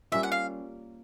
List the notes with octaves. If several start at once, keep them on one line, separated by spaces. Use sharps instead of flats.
G3 A#3 C#4 F4 E5
F#5
F5